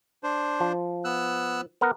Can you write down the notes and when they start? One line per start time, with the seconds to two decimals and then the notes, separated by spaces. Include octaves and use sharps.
0.23 D4 C5
0.60 F3
1.04 B3 E6 F#6
1.81 B3 A#4 F#5